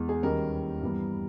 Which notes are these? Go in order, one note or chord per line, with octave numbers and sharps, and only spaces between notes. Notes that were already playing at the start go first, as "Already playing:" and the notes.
Already playing: E2 G#3
G#4
D#2 D#3 G3 C#4 A#4
G2 E3 G3 B3